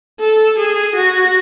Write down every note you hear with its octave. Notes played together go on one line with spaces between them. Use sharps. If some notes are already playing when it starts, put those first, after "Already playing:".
A4
G#4
F#4